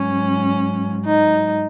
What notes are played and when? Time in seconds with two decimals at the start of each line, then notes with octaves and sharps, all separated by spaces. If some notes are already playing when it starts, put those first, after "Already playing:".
Already playing: G#2 F#3 C#4
1.05 D#4